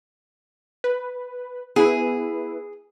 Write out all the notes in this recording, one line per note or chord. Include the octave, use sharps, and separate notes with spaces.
B4
B3 E4 G#4 B4